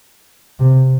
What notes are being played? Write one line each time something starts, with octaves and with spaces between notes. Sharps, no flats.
C3